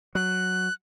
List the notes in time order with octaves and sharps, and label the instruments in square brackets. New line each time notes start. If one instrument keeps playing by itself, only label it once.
[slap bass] F#3 [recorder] F#6